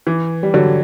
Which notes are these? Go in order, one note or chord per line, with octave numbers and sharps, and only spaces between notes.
E3
G3
D3 F#3